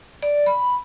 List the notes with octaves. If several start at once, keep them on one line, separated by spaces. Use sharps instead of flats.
D5
B5